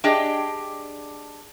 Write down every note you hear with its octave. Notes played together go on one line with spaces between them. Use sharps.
D4 G4 G#4 D5 D#5 G5